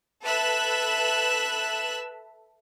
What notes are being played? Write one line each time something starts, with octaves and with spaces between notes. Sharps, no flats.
A4 B4 E5 E6 F#6